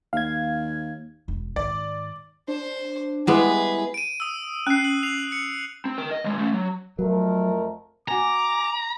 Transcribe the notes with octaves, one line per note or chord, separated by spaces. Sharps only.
D#2 F5 G#6
E1
G#2 D#3 D5
D4 C5
G3 G#3 B3 E4 G#4 B4
D7 D#7
D#6 E6
C#4 F#6 C7
F#7
C7 F7
C#7
C4
A#4 G5
D#5
D#2 G#3
A3 C#4
F#3
F2 F#3 A3 A#4
F#4 G#5 A#5 D6